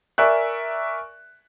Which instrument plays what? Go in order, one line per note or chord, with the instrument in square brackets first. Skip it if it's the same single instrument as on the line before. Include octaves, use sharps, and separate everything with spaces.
[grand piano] A#4 D5 E5 G#5 C#6 F#6